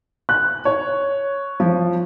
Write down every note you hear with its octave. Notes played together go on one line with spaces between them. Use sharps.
F#6
C#5
F3